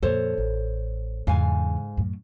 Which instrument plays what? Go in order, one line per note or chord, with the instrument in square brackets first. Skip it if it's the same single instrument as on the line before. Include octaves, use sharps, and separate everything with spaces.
[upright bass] F2 A#2 [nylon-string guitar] A4 C5 C#5
[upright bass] A1
[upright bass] E2 C#3 [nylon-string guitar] G#2 F5 G#5
[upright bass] F#2 A2